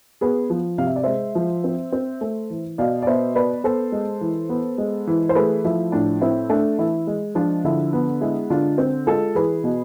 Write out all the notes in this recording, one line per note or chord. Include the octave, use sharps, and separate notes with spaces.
B3 G#4 B4
F3
C3 F5
E5
D5
G#3 C5 E5
F3
C4
C4
A3
E3
B2 D5 F5
D5
B3 C5 E5
B3 B4 D5
B3 A4 C5
G#3
E3
B3
G#3
E3
C5
A3 G#4 B4
F3 E4
A2 D4
C4 E4
A3 D4
E3 E4
G#3
F3 D4 F4
D3 E4
B3
G#3 E4 G#4
D3 D4 F4
C4
G#3 F4 A4
E3 G#4 B4
B2